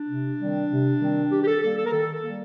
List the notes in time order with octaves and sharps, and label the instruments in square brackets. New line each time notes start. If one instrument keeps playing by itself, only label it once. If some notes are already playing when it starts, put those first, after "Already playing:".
Already playing: [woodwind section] D4
C3
D#3 G3 C4
C3
D#3 G3 C4
D#3 G4
G4
A4
G3 A#3 A4
A4
A#4
D#3 A4
A4
G3 A#3